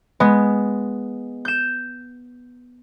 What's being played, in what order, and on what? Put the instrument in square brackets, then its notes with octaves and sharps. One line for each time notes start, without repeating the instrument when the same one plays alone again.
[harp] G#3 B3
G6 E7